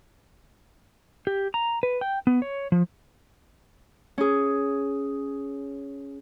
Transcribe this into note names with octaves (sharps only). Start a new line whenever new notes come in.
G4
A#5
B4
G5
B3
C#5
F3
C#4 G#4